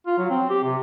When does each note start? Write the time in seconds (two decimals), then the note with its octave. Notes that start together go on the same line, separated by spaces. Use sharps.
0.07 F4
0.18 F#3
0.30 C4
0.50 G4
0.64 C3